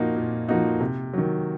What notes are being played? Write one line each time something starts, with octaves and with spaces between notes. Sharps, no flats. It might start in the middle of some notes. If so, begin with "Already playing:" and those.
Already playing: A#2 F3 A#3 D#4 F#4
A#2
F3 A#3 D#4 F#4
C3
D#3 F#3